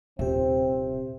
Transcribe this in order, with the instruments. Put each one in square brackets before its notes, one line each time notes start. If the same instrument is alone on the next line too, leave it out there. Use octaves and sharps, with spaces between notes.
[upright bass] D#1 [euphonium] C3 [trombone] C4 [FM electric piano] G4 E5